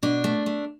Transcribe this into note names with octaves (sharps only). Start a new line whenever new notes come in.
B2 D4
A3
A3